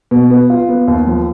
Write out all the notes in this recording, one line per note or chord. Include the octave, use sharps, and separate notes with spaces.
B2
B3
F4
B3
D#2
F3